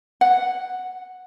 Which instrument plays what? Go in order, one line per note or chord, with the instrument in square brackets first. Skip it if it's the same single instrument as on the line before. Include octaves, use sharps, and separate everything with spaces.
[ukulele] F#5